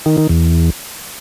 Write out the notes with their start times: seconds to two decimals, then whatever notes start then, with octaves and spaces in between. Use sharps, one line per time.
0.06 D#3
0.18 D#3
0.29 E2